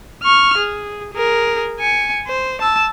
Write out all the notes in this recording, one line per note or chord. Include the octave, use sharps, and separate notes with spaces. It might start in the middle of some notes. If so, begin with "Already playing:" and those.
C#6 F6
G#4
G#4 A#4
G#5 C#7
C5
A5 E6